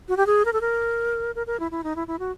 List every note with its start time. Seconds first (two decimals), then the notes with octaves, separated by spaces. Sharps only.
0.09 F#4
0.17 G4
0.27 G#4
0.45 A#4
0.53 A4
0.61 A#4
1.35 A#4
1.47 A#4
1.60 E4
1.71 E4
1.84 D#4
1.96 E4
2.08 E4
2.19 F#4